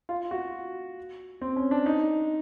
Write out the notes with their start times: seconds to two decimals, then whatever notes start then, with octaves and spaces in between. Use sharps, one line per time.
0.09 F4
0.31 F#4
1.42 C4
1.56 C#4
1.71 D4
1.86 D#4